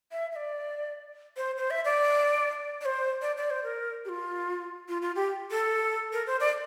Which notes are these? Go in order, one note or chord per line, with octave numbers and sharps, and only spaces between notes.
E5
E5
D5
C5
C5
E5
D5
D5
C5
D5
D5
C5
A#4
G4
F4
F4
F4
G4
A4
A#4
C5
D5